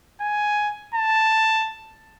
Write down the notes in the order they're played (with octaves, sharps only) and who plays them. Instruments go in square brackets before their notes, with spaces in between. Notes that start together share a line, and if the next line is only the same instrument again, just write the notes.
[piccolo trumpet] G#5
A5